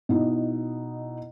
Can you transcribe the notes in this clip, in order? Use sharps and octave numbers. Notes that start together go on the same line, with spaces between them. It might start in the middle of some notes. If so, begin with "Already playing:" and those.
B2 D#4 E4